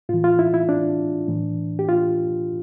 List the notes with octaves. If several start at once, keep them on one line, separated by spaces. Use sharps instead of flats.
A2 E3 F4
F4
E4
E4
D4
A2 E3
G4
F4